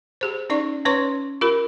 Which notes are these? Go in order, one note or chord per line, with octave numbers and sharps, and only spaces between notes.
G4 G#4 C5
C#4 D#4 D5 C#6
C#4 B4 C#5 C6 C#6
F4 G4 A#4 B5